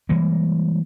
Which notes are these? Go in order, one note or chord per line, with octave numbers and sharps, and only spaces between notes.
E3 G3 G#3 A#3